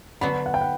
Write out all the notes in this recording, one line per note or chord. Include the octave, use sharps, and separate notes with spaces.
D3 F#3 B3 B5
F#5
G5
F#5